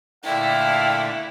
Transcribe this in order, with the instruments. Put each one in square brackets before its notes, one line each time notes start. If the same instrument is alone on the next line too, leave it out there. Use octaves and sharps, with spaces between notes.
[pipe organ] A#2 D3 A3 [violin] E4 [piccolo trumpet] F5 [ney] G5